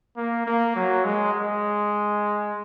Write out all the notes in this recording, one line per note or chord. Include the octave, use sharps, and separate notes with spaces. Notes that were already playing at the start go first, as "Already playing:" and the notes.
A#3
A#3
F#3
G#3
G#3